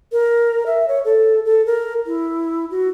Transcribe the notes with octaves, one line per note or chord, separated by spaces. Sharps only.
A#4
E5
C#5
A4
A4
A#4
E4
F#4